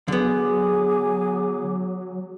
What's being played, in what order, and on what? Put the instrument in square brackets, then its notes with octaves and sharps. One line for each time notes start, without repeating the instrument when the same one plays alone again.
[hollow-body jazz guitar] D3 B3 [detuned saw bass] F#3 [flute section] G#4 G#5 D6